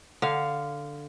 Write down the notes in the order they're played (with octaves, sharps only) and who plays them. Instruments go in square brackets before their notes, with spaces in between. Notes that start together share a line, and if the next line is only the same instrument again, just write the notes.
[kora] D3 F5